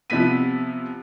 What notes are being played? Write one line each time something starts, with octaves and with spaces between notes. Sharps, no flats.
C3 F3 B3 B6 D#7